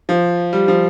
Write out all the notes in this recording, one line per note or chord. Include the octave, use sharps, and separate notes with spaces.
F3
G3
F3